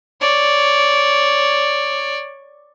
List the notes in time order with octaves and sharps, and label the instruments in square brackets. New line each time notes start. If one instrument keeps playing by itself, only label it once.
[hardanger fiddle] C#5 D5